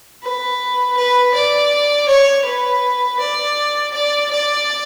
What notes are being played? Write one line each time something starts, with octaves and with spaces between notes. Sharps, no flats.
B4
B4
D5
C#5
B4
D5
D5
D5